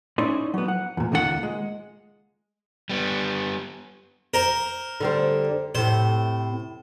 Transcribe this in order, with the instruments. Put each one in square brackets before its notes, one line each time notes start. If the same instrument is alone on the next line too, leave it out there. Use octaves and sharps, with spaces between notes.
[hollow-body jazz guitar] C#4 D#4 E4 C#5 D5 C6
F#3 B3
F#5
E2 A#2
C#2 A#2 D#3 F4 A4 F#5
G#3
[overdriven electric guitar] G3 B3
[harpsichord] A#4 C5
[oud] D3 G3 C4
[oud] A2 C3 [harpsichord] C5